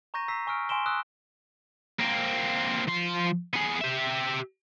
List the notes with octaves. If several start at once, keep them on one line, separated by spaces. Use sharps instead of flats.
A#5 C#6 G6 A#6 D#7
A#5 E6 B6 C7
G#5 C#6 E6 F6 D7
G#5 C6 D7 E7 G7
D#6 E6 F#6
A#3 C4
F3 C6
B3 G#4
G4 E5